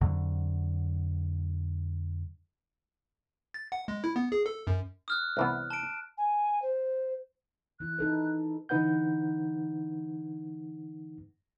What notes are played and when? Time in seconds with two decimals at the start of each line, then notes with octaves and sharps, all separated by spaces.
0.01 F2 D3 F#3
3.54 A6
3.72 F#5
3.88 G#3
4.04 E4
4.16 B3
4.32 G#4
4.46 A4
4.67 F#2
5.08 D#6 F6 F#6
5.37 C2 E3 B3
5.70 A5 D7
6.18 G#5
6.62 C5
7.80 E3 E4 F#6
7.98 D#4 A4 B4
8.69 D3 E3 D#4 B4 F#5 G6